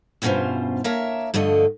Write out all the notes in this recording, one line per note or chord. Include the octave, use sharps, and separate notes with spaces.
E2 G2 B2 C#4 F4 C5
A#3 A#4 C#5 E5 A5
G2 D3 F3 A3 D#5